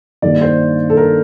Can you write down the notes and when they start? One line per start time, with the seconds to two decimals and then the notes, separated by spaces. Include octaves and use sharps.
0.22 G2 D#3 A#3 D4 D5
0.41 C5
0.90 A4
0.97 A#4